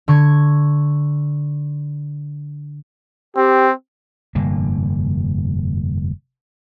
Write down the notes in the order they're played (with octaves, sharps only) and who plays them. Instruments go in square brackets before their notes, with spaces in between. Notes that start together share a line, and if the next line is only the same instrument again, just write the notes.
[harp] D3 C#6 G#6
[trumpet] C4 [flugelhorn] G4
[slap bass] F1 G2 D3 A#3